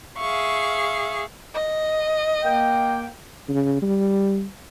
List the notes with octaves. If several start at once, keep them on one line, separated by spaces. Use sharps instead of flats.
G#4 E5 F5 C#6
D#5
A#3 G5
C#3
G3